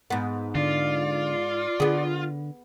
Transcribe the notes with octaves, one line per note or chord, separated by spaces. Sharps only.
G#2 B3
D3 F4 D5
D3 B3 G#4